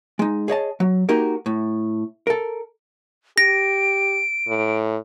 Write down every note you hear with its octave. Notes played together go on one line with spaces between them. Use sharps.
G#3 D#4
G#4 C#5 D#5 A5
F#3
A#3 D#4 F#4 G4 A#4
A2
A4 A#4
G4 A#6 D7
A2